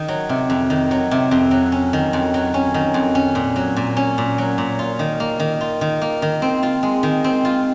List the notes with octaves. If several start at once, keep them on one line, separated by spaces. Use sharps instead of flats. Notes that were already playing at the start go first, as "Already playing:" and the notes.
Already playing: D#3
F#3
C3
F2
D#3
F#3
C3
F2
F#3
C#4
D#3
F2
F#3
C#4
D#3
F2
C#4
A#2
F#3
A#2
C#4
A#2
F#3
A#2
F4
D#3
A#3
D#3
F4
D#3
A#3
D#3
C4
F4
G#3
D#3
C4
F4